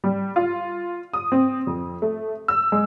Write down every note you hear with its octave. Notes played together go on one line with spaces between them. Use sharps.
G3
F4
D#6
C4
F2
A3
E6
G#3